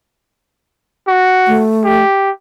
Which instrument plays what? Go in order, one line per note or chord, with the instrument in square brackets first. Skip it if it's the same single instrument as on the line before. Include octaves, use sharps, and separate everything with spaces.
[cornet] F#4
[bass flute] A3
[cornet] G4